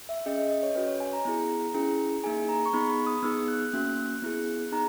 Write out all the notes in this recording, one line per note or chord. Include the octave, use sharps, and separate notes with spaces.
E5
C#4 G#4 D#5
D#5
D#5
C#5
C#4 F#4 B4
C#5
G#5
A#5
B3 E4 G#4
C#4 E4 G#4
A#3 D#4 G#4 G#5
A#5
C#6
B3 D#4 G#4 B5
B5
D#6
B3 D#4 G#4 E6
F#6
A#3 C#4 F#4 F#6
B3 E4 G#4
B3 D#4 G#4 A#5